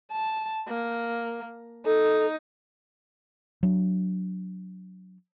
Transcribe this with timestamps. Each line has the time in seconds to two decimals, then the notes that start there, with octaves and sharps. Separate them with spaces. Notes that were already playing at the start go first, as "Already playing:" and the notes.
0.12 A5
0.68 A#3
1.86 D#4 A4
3.63 F#3 D4